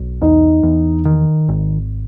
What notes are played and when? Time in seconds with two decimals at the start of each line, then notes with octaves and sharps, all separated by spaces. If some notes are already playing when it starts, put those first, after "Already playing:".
Already playing: B1
0.21 E2 D#4
0.63 E2
1.05 D#3
1.49 G#1